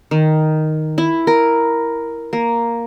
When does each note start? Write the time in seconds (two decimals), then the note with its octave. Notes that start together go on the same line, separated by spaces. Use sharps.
0.11 D#3
0.98 E4
1.27 A#4
2.33 A#3